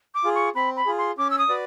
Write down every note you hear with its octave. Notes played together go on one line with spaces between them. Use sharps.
D6
F4 G#4
C#6
C4 B5
B5
F4 G#4
C6
C#4 D6
E6
D#6
F#4 B4 D5